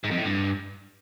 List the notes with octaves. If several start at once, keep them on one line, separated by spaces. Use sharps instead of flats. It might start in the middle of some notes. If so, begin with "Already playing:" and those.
G#2
F2
A2
G2